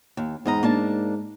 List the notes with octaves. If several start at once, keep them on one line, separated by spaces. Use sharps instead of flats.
D#2
E2 G#2 D#5 A#5
A#3 D4 A5